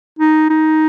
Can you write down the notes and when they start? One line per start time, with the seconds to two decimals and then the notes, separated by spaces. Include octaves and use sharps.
0.19 D#4
0.50 D#4